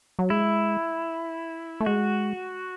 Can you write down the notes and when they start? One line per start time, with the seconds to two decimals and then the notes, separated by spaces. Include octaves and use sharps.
0.19 F#3
0.30 G#3 E4
1.80 A3
1.86 G#3 F#4